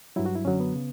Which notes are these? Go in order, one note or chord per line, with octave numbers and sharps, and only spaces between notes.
G2 F#3 E4
F#4
E4
F#2 D3 F#3 C#4
B3
C#3